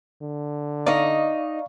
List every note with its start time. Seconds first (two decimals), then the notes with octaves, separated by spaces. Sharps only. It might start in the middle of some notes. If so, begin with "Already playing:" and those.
0.22 D3
0.87 D#4 D5 D#5 F5 C#6